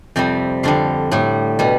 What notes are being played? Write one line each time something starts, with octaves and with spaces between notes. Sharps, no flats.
F2 C3 G3 G5
F2 D3 G3 F5
A2 G3
B2 G3